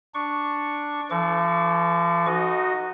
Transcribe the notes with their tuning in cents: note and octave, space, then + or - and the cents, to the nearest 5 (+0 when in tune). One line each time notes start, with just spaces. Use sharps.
D4 +0 C#6 +0
F3 -45 A4 +0 C#6 +40
D#4 -20 F#4 +0 D#5 +0